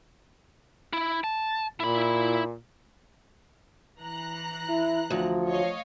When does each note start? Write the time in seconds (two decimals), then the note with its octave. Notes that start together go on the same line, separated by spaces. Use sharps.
0.93 E4
1.24 A5
1.80 A#2 E4 B5
3.99 E3 A#5 F#6
4.69 E4
5.10 D2 F3
5.47 C#5 D#5 F5